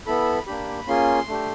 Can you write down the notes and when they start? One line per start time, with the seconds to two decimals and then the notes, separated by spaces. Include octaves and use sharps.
0.06 B3 E4 A4 B5
0.47 A#3 D4 G4 B5
0.87 A#3 C#4 F4 G#4 C6
1.28 A3 D4 G4